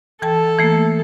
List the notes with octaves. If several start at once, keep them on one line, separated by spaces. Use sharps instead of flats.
E3 A4 G5 A5
E3 A3 A#3